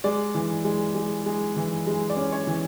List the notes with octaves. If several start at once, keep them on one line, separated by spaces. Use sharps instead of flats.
G#3 D5
E3
G#3
G#3
G#3
E3
G#3
D5
C#4
C#5
E3